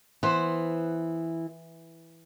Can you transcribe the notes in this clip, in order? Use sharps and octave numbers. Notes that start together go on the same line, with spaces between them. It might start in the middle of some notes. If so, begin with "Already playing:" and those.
E3 B3 C5